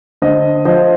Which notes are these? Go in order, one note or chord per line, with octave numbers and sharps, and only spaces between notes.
D3 C5 D#5
F3 C5 D#5